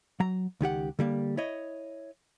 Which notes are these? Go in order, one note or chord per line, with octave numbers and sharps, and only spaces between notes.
F#3 A#5
C#2 D#3 G4 F#5
D3 G3 A#3
E4 C#5 D#5